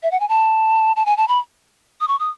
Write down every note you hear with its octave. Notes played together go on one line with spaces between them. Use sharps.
E5
F#5
G#5
A5
A5
G#5
A5
B5
D#6
C#6
D#6